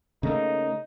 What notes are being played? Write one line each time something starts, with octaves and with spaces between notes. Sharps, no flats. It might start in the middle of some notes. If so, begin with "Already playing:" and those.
C#3 A3 A#3 D#4